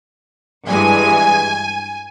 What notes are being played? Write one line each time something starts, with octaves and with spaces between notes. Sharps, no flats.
G2 E3 G#3 G#5